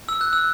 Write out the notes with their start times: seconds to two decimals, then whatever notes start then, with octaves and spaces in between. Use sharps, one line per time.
0.09 E6
0.21 F#6
0.33 E6